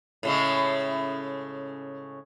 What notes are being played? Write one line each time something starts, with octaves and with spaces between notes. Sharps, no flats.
A2 C#3 G#3